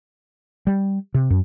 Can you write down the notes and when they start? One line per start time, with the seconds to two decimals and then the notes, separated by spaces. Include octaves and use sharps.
0.67 G3
1.14 C3
1.30 F#2